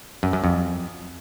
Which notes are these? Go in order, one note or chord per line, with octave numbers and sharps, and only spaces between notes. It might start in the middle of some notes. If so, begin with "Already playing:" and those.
F#2
F#2
F2